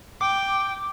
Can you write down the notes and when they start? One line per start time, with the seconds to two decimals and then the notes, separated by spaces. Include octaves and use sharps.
0.21 G5 D6